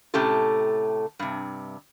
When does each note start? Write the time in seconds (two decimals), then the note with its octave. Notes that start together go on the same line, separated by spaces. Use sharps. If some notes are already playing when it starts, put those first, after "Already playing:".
0.14 A2 C3 A3 C#4 G4 A4
1.19 G2 C3